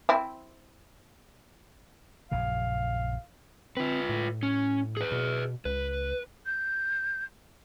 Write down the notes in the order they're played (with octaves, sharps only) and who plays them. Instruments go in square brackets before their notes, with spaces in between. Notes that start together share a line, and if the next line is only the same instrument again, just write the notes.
[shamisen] C4 E4
[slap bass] A#1 F#2 C#3 [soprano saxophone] F5
[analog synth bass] C4 [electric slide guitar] F4 B4
[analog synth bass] A2
[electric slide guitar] C#4
G#4 B4
[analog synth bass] B2
[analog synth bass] C#2 [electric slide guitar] B4
[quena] G6